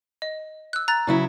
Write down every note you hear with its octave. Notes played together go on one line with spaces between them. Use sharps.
D#5
E6 F#6
A#5 F#6 A6
C#3 F#3 E4